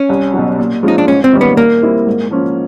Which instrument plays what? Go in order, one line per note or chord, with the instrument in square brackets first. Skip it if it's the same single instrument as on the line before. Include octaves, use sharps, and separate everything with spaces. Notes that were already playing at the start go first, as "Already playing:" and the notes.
Already playing: [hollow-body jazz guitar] C#4
[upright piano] C2
B2 F#3
A#2
[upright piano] F3 G#3 C#4 F4 [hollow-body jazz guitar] D#4
[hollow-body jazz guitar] D4
[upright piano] G#2 [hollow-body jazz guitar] C#4
[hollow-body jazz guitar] C4
[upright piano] D#3 G3 A#3 C#4
[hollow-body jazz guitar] B3
[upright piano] A#2 [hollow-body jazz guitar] A#3
[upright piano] G3 C4 E4
G#2
F3 A#3 C#4 F4